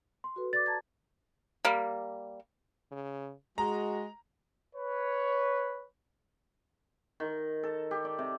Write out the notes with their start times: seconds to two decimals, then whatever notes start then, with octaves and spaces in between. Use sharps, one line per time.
0.24 C6
0.36 F#4 A4 B4
0.53 D5 D6 A6
0.66 A5 A#5 G#6
1.65 G3 A#3
2.91 C#3
3.58 G#3 F#4 A#5
4.75 B4 C#5
7.20 D#3
7.63 A4
7.91 G4
8.05 D5
8.19 C3